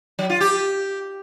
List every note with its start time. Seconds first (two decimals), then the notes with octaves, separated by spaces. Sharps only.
0.19 F#3
0.30 F4
0.40 G4